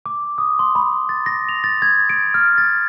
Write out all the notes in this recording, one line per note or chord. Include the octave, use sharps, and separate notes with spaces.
D6
D#6
C6
B5
A6
A#6
F7
A6
G#6
D7
F6
A6